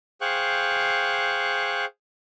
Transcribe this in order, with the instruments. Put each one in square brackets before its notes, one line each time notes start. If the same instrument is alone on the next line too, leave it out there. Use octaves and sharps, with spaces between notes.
[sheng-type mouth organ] G#4 C5 F5 G5 C#6 F#6